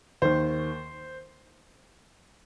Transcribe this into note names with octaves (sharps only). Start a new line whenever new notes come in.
D#2 D#3 C5